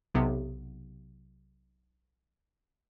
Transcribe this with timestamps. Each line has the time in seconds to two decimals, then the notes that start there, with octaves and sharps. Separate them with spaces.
0.15 B1 C3 B3